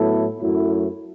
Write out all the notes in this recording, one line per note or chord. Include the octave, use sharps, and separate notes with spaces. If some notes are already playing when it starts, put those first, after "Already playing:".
Already playing: A2 F#3 B3 E4 A4
F#2 F#3 A3 E4